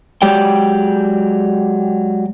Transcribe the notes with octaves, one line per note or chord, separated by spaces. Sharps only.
F#3 G#3 G4 D5 G5